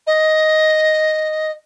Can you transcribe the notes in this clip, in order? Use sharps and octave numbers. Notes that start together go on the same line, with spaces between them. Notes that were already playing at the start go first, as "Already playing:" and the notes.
D#5